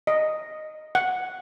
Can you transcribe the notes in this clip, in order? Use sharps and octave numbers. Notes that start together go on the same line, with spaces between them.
D#5
F#5